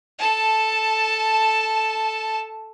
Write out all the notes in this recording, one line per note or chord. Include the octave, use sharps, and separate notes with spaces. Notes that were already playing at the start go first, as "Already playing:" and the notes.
A4 A5